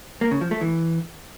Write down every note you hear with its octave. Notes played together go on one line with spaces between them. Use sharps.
A#3
C#3
F3
A3
E3